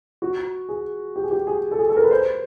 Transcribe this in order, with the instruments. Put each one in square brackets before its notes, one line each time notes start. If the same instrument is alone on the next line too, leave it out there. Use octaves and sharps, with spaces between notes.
[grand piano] F#4
G#4
G4
G#4
G4
G#4
A4
G#4
A4
A#4
B4
C5